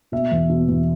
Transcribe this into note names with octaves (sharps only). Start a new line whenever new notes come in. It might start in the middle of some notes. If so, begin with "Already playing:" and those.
B2 E5
E2
B2
E2